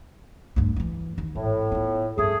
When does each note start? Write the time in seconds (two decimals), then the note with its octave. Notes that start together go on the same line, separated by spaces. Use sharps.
0.56 D2 G2
0.76 D#3 E3
1.18 D#2
1.35 G#1 A2
1.72 B3 F4
2.18 G1 F2 A3 G#4